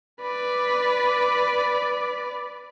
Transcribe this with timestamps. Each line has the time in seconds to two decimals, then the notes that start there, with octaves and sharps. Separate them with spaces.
0.21 B4 D5